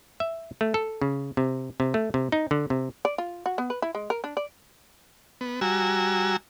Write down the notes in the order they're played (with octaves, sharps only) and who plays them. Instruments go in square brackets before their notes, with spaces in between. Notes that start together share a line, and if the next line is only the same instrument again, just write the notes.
[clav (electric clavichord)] E5
A3
A4
C#3
C3
C3
A3
C3
D#4
D3
C3
[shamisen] D5
F4
F#4
B3
B4
E4
G#3
A#4
D4
D5
[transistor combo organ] B3
G3 F#4 G#5 A#5 E6